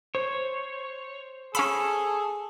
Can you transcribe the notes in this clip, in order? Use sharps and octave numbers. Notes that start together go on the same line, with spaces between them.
C5 C#5
C#4 G#4 A4 F5 B5